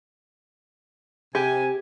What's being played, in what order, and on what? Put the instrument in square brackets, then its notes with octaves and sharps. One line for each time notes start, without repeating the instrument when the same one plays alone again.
[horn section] C3 G#5 [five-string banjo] G4